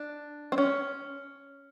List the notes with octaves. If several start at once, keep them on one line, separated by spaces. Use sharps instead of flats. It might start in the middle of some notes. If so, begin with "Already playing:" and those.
Already playing: D4
C4
C#4